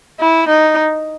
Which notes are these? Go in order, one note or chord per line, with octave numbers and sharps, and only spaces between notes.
E4
D#4